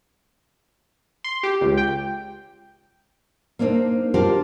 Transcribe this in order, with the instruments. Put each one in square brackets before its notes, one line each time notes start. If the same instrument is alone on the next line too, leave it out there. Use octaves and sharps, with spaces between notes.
[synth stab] C6
G4
C#2
G5
[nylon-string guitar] A#3 C4 D4 D#4
D4 F4 G4 A#4 C5